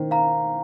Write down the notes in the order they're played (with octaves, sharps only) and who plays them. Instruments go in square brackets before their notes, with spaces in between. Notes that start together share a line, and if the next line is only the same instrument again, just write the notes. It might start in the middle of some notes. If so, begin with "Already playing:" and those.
Already playing: [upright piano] D#3 [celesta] C5
[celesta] F5 A#5